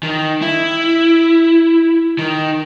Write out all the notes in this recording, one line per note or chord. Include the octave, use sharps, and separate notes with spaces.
D#3
E4
D#3